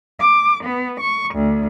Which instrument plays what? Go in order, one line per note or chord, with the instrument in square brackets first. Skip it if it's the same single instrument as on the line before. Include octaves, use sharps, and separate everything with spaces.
[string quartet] D6
B3
C#6
D2